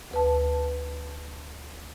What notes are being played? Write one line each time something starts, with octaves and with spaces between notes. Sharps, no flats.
D2 B4 A5